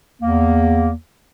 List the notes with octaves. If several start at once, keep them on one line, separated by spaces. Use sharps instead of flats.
E2 A#3